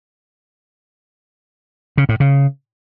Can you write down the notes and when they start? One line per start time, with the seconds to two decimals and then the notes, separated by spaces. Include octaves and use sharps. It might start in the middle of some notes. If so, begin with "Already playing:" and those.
1.98 C#3
2.09 A2
2.20 C#3